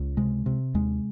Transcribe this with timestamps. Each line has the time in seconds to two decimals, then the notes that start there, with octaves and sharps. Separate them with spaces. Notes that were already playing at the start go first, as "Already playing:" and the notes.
Already playing: C#2
0.17 C3 G#3
0.46 C3
0.74 D#2 G#3